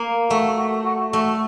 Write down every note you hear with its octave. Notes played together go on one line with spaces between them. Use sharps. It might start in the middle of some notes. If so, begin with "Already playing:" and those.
Already playing: A#3
A3 F#4
F#4
F#4
A3 F#4